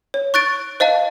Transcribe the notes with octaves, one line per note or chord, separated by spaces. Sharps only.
C#5
C#6 F#6 A6 D7
C5 D#5 F5 A5